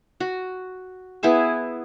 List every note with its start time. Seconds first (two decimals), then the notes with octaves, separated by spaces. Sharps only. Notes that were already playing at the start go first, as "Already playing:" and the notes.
0.20 F#4
1.23 B3 E4 G#4 E5